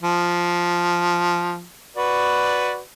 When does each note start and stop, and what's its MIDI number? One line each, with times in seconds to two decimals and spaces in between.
0.03 1.64 53
1.97 2.80 66
1.97 2.80 71
1.97 2.80 74